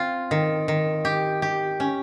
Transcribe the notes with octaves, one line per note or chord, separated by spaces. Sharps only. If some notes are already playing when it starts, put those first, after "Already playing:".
Already playing: C4 F4
D#3
D#3
G4
G4
C#4